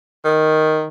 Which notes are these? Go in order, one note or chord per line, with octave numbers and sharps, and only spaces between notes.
D#3